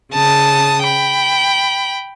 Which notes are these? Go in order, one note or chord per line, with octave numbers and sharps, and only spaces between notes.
C#3 A5 D#6
G5 B5